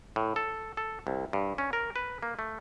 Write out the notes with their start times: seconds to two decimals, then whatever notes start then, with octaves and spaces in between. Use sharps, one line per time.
0.16 A2
0.36 A4
0.77 A4
1.07 C2
1.33 G2
1.58 C#4
1.73 A#4
1.96 B4
2.23 A#3
2.39 A3